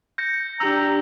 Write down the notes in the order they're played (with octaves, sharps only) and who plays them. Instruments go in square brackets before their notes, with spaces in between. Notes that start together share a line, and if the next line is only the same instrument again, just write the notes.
[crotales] G6 A#6 C#7
[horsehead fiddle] D4 G4 [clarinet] A#5 [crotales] E6